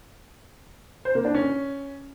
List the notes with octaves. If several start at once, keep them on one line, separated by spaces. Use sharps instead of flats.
C5
A#3
D4
C#4